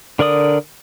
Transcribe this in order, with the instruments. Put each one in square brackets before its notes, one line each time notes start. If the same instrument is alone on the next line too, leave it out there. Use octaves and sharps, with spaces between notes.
[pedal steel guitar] D3 A#4 D5 D#6